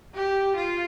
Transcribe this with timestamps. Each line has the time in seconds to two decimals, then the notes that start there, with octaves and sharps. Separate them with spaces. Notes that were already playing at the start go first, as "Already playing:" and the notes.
0.15 G4
0.57 F4